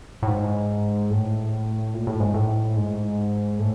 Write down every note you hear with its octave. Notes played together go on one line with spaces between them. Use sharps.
A2
G#2
A2
A#2
A2
G#2
A2
G#2
A2